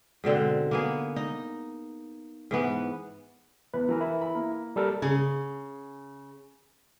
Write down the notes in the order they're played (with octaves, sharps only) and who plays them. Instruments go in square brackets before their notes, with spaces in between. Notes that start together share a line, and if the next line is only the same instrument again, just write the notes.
[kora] G#2 B2 D3 C4
A#3 B3 G#4
D#4
G#2 E3 B3
[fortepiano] E2 [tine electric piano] B4
[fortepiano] E3 A#4
[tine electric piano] E4
[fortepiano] B5
A#3
[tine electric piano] G3 A4 A#4
[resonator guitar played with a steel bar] C#3 [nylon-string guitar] G#4